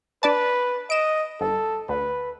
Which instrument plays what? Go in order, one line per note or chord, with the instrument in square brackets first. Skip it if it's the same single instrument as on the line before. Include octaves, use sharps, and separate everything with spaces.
[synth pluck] D4 D5 A5 [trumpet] B4
[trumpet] D#5 [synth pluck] D7 E7
[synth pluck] G1 [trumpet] A4
[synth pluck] D2 [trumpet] B4